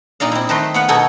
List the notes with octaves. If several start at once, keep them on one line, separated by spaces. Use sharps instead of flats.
A#2 D#4 D5 F5
C4 E4
D#3 A3 B4 A#5 C6
B3 F5 F#5
B2 D#4 A4 G#5